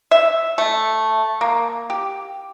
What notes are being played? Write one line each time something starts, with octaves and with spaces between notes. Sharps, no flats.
E5
A3
A#3
G4